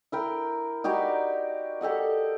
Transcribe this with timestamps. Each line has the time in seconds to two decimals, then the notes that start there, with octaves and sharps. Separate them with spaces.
0.12 E4 A#4 G5
0.84 D#4 F#4 G4 D5
1.81 G4 A4 D#5 F#5